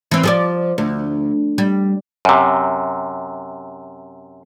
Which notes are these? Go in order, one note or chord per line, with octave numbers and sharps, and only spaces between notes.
E3 C4
F3 G#4 D5
D2
G3
F#2 C3